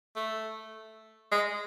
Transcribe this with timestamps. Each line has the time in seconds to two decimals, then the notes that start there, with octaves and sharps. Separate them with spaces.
0.16 A3
1.32 G#3